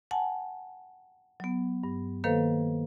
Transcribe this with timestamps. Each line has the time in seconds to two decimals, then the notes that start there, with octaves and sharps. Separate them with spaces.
0.11 F#5 G#5 A5
1.40 F#3 B3
1.84 G2
2.24 D#3 A#3 A4 B4 C5 F5